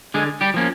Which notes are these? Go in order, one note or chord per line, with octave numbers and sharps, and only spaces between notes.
D3 G#3 G#4
G3 G4
F3 A#3 C#4